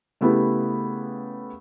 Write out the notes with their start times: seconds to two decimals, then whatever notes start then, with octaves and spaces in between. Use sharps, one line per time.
0.21 C#3 A3 B3 E4 G4